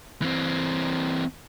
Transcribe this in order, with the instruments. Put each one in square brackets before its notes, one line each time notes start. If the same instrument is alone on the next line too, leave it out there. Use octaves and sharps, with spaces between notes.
[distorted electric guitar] E3 C4